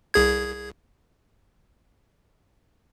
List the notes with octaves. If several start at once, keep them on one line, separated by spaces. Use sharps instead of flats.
C2 G#4 G#6